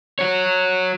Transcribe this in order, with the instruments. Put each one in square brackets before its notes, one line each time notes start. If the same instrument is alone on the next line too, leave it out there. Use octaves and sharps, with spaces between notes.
[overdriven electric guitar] F#4 C#5